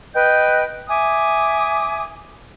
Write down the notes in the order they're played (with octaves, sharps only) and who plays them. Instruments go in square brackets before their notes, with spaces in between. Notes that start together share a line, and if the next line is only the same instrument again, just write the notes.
[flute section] B4 D#5 G5 G6
E5 G#5 D6 D#6